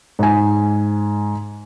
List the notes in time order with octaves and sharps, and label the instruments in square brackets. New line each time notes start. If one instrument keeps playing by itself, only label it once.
[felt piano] G#2 G#5